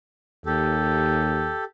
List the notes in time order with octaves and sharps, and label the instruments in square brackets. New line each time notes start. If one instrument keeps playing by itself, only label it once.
[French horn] D#2 [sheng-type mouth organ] G4 A4